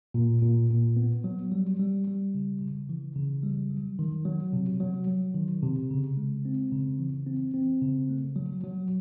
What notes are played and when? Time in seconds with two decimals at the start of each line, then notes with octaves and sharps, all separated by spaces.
0.14 A#2
0.42 A#2
0.70 A#2
0.96 B3
1.24 F#3
1.52 G3
1.79 G3
2.07 G3
2.34 C#3
2.61 C#3
2.89 E3
3.16 C#3
3.43 G3
3.70 F#3
3.99 D#3
4.25 F#3
4.53 C3
4.80 F#3
5.07 F#3
5.35 D#3
5.63 C3
5.91 C#3
6.17 G#3
6.45 C4
6.72 C#3
6.99 E3
7.27 C4
7.54 C4
7.82 C#3
8.10 A3
8.36 F#3
8.64 F#3